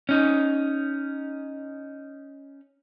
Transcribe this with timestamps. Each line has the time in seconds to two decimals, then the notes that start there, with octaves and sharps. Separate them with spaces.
0.09 C#4 D#4